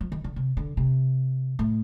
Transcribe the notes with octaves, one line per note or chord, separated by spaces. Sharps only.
F3
D#3
D3
C3
D3
C3
A2